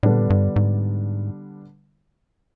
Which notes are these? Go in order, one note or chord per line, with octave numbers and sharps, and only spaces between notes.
A2 D3 G3 B3 D4
A#2
A2
G2
G#2